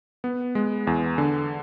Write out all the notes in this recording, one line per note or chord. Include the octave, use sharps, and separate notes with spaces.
B3
G#3
E2
D3